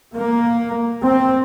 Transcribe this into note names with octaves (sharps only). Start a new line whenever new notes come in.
A#3
C4